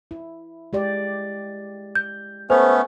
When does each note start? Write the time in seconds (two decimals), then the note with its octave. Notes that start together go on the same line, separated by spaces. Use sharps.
0.11 E4
0.73 G#3 G4 D5
1.95 G6
2.50 A3 B3 C#4 A4 C5